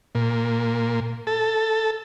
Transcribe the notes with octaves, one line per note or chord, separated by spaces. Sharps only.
A#2
A4